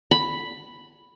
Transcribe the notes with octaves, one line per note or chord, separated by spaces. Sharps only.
B5